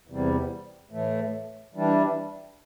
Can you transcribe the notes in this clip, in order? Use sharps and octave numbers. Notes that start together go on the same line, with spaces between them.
E2 C3 G3
A2 E3 A3
E3 G3 D4